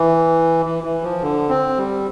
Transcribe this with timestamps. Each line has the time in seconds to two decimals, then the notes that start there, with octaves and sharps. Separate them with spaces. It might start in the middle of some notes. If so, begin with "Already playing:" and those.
Already playing: E3
0.65 E3
0.84 E3
1.03 F3
1.22 D3
1.49 C4
1.78 G3